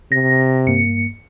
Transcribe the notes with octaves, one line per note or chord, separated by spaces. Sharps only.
C3 A#6
G2 A#3 C#7